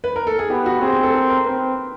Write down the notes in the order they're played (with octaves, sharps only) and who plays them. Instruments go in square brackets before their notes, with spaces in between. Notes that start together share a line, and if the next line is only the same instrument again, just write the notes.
[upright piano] B4
A#4
A4
G#4
[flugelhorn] B3 [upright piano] G4
[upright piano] F#4
[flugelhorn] C4 [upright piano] G#4
[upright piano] G#4
A4
A#4
A#4
[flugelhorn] C4 [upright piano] B4